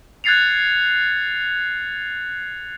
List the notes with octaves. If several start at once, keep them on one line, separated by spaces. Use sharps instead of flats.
F#6 G#6 A6 C7 C#7 F7